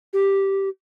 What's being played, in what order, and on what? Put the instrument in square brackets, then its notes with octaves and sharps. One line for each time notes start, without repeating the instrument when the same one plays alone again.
[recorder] G4